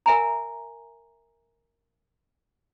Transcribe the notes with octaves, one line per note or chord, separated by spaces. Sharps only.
A#4 E5 G#5 A#5